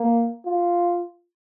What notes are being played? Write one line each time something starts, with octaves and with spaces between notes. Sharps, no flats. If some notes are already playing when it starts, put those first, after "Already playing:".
Already playing: A#3
F4